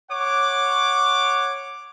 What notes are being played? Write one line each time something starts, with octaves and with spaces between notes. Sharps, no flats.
C#5 F#5 D6